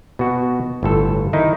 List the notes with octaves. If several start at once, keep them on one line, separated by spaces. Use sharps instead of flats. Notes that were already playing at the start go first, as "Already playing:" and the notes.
B2 F#4
G1 A2 A4
D#3 D#4 E4